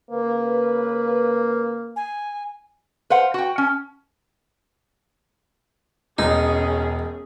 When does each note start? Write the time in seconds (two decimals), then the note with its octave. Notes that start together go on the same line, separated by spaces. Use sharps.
0.11 C#3 A#3 B4
1.96 G#5
3.10 B4 C5 F5 F#5
3.34 F#4 G5
3.58 C#4
6.18 E1 C#4 D#4 G#4